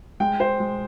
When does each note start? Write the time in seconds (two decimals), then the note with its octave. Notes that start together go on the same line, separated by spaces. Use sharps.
0.20 G#3 G5
0.40 C5
0.60 G#3